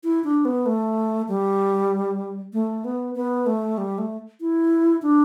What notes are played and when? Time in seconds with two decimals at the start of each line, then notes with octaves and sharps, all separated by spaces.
0.04 E4
0.24 D4
0.45 B3
0.66 A3
1.28 G3
2.53 A3
2.84 B3
3.15 B3
3.46 A3
3.78 G3
3.98 A3
4.40 E4
5.02 D4